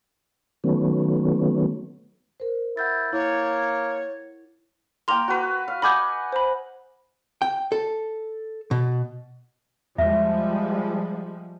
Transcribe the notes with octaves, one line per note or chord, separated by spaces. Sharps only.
D#3 F#3 A3 B3 C#4
A#4 C5
E4 F#5 G6 A6
A#3 E4 C#5
A#3 A#4 G5 C6 F7
F#4 B4
F5
D#5 F#5 G#5 B5 D6 G6
C5 B5
G5
A4
B2
E2 F3 G3 G#3 E5